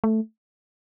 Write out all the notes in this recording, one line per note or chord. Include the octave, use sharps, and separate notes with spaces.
A3